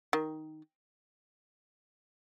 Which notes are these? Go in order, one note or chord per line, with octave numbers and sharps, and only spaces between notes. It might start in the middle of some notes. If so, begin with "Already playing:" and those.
D#3